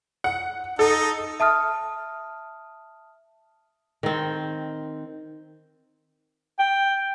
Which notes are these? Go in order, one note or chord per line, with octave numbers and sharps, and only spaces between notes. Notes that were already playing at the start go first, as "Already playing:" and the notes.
F#5
D#4 A4
E5 A5 D#6 F6
D#3 C4
G5